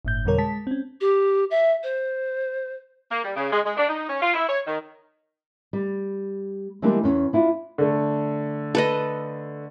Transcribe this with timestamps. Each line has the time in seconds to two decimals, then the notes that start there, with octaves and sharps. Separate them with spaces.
0.05 G1 A2 G6
0.25 F2 B2 D3 G3 A#4 C#5
0.38 G#3 A5 B6
0.67 C4 C#4
1.01 G4
1.51 E5
1.83 C5
3.11 A#3
3.24 G3
3.36 C#3
3.52 G#3
3.66 G#3
3.77 D4
3.89 D#4
4.09 C#4
4.22 F4
4.34 E4
4.49 C#5
4.67 D#3
5.73 G3
6.82 E3 G3 G#3 A#3 D4
7.03 E2 C#4
7.33 D4 E4 F4
7.78 D3 A3
8.75 A4 B4 D#5